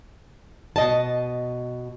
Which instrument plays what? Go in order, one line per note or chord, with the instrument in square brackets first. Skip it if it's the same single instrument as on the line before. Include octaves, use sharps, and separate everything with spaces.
[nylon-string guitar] B2 D#5 A5